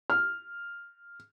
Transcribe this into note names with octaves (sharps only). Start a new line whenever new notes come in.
F6